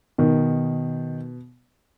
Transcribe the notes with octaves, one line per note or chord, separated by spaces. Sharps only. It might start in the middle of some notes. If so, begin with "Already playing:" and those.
B2 D#3